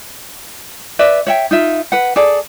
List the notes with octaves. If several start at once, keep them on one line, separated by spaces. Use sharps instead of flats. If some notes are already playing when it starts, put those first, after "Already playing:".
B4 D5 E5
C#5 E5 G5
D#4 F4 E5
B4 F#5
G#4 A4 D5